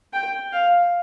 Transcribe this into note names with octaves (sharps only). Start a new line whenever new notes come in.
G5
F5